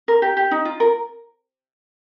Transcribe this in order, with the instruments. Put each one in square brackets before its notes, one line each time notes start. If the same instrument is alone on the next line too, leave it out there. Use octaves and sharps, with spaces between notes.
[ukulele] A#4
G4
G4
D#4
F4
A#4